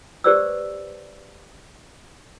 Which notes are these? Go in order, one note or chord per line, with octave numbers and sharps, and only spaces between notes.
G4 B4 C5 D5 D6 E6